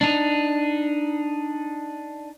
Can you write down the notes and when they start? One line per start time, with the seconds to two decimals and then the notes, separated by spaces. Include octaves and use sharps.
0.01 D4 D#4